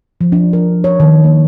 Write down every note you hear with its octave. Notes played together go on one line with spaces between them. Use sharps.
F3
D4
A#4
C#5
D#3
A#3